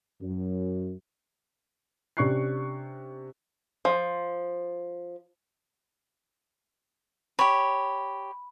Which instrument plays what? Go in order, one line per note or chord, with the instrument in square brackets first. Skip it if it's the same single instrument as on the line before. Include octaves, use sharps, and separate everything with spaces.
[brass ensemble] F#2
[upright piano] C3 C#4 D4 C#6 F#6 C7
[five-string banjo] F3
[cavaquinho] G4 C#5 [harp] B5